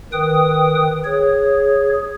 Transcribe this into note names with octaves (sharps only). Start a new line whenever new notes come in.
D#3 B4 G5 D#6
G#4 C#5